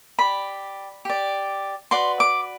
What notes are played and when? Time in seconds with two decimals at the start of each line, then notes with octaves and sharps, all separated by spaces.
0.19 G4 D5 B5
1.05 G4 D5
1.91 F#4 B4 D5 C6
2.20 D6